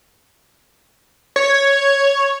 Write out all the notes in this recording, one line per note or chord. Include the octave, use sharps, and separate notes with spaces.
C#5